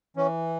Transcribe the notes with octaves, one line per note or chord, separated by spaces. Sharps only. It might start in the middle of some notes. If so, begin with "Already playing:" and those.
E3 C#4